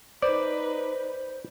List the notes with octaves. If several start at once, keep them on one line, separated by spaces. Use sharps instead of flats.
D#4 B4 C5 D5